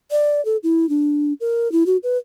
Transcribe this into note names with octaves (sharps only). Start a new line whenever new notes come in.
D5
A4
E4
D4
A#4
E4
F#4
B4